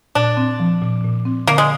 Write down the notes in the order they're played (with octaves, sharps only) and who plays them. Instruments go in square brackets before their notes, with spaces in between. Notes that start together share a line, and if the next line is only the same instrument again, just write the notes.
[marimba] A#2 [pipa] D4
[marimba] C4
F3
A#2
A#2
C4
[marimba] D3 [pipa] A#3
[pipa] G#3